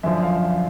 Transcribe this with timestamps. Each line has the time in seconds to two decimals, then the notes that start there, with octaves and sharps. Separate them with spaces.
0.03 F#2 D3 F3 E5
0.23 F5